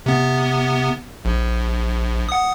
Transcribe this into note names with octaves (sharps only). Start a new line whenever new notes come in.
C3 B3
A#1
F#5 D#6